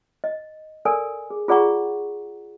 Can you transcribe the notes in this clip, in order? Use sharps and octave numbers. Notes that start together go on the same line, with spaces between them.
D#5
A4 A#4 D5 G#5
G#4
F4 G#4 D5 F#5 A#5 C#6